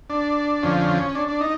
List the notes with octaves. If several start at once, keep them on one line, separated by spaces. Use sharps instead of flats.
D4
F2 D3 F3 C#4
C#4
D4
D4
D#4